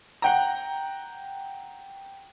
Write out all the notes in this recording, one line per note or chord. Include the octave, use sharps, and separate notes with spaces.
F#5 G5 A#5